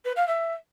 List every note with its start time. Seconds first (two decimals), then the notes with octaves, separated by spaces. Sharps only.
0.05 B4
0.16 F5
0.27 E5